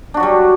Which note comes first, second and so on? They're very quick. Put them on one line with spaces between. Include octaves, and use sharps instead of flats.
D4 F#4 F#3 G3